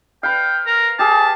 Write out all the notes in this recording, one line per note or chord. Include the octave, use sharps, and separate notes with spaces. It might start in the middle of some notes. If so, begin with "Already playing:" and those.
B4 F5 G5
A#4
G4 G#4 A5